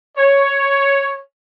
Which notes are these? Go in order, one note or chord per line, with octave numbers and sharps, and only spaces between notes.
C#5